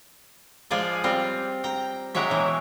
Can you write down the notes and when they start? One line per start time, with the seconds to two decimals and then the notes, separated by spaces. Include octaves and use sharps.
0.71 F3 G#3 F4 G#4 D5 G#5
1.04 G3 C4 F4
1.64 G5 A#5
2.15 F#3 G#3 G4 C#5 E5
2.30 B2 E3